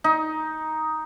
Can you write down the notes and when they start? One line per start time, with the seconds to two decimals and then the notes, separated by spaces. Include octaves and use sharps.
0.04 D#4